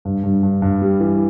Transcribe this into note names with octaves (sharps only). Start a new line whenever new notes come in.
G2
G2
G2
G2
G3
E3